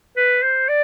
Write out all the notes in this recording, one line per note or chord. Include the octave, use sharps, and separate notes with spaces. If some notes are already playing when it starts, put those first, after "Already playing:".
B4
C5
D5